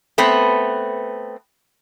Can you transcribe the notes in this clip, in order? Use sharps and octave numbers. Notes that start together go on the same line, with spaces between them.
A3 B3 C4 B4